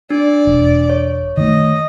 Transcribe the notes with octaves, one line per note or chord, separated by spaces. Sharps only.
D4 D5
E1
C#5
D#3 A3 D#5